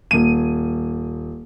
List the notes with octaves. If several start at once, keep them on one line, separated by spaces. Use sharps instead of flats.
D#1 D#7